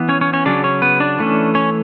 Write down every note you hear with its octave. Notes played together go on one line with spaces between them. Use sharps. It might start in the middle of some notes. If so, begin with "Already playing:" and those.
Already playing: E3 B3
C#4 C#5
C#4 C#5
C#4 C#5
C#3 F#3 C#4 D4 D5
C#4 C#5
B3 B4
D4 D5
E3 A3 C#4
C#4 C#5